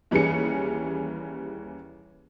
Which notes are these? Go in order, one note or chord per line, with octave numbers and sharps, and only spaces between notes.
D#2 E3 G3 C#4 G#4 C#7